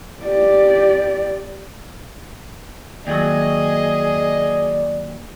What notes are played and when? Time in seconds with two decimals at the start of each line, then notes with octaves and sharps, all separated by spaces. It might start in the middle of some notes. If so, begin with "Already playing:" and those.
0.23 G4 D5
3.07 D#2 F#3 G#4 D5 D#5